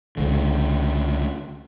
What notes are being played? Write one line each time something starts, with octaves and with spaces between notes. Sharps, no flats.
C#2 D3